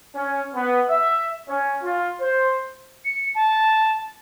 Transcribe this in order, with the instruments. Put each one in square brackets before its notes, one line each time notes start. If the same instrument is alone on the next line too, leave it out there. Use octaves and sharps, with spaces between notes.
[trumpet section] C#4
B3
E5
C#4
F4
C5
[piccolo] C#7
A5